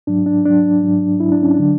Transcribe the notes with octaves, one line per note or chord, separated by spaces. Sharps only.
G#2 F#3 D4
D4
G#2 F#3 D4
G#2 F#3
G#2 F#3 E4
D4
C#4
D4
D3 F#3